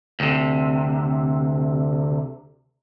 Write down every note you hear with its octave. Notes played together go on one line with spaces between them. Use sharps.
D2 C3